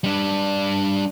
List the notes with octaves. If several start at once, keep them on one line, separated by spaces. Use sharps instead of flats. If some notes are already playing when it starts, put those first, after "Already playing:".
G3 D4